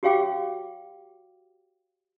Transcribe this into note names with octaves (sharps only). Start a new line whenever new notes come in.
F#4 G4 C#5 F5 G5 D6